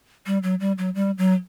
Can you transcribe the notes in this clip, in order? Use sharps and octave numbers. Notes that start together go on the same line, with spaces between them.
G3
F#3
G3
F#3
G3
F#3